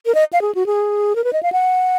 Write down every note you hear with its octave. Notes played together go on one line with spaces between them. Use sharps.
A#4
D#5
F5
G#4
F#4
G#4
A#4
B4
D#5
F5
F#5